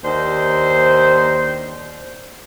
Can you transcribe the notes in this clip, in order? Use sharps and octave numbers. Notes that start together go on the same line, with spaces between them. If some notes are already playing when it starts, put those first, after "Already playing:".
D#2 D4 C5